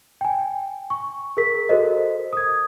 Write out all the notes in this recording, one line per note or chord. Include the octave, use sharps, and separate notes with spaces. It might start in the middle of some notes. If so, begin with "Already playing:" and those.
G5 G#5
C#6
G#4 A#4 B6
F#4 A4 A#4 C5 D#5
D#6 G#6